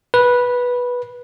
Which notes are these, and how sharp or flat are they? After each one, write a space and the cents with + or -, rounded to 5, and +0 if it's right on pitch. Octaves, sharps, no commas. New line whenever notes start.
B4 -10